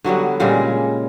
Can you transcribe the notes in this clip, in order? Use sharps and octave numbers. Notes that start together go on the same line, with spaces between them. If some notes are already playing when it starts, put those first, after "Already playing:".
D3 F#3 G3 B3
A#2 C#3 G3 G#3